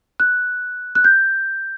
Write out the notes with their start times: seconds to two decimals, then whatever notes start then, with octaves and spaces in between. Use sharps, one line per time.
0.20 F#6
0.95 F#6
1.04 G6